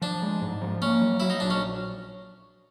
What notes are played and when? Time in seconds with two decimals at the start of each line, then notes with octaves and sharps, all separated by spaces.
0.02 F3 D4
0.22 G#3
0.42 G#2
0.62 F3
0.81 A#3 C#4
1.02 F#3
1.20 F#3 E4
1.30 D#4
1.40 A#1 D4
1.50 C#4